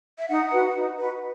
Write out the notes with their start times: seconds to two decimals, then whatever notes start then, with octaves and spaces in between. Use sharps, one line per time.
0.19 E5
0.29 D#4 F#5
0.52 F#4 B4
0.75 D#4
0.99 F#4 B4